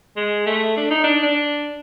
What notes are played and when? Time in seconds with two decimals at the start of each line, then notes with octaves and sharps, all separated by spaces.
0.16 G#3
0.47 A3
0.77 D4
0.90 D#4
1.04 D4
1.23 D4